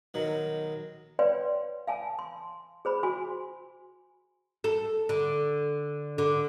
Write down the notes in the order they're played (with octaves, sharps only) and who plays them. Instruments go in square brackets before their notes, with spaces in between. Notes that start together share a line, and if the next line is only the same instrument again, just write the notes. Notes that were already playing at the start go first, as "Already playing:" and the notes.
[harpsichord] B1 D#3 F#3
[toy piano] B4 C#5 D5 F5 G5 C6
F5 G#5 A5
C6
G#4 C5 B5
F#4 G#5 C6
[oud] A4
D3
D3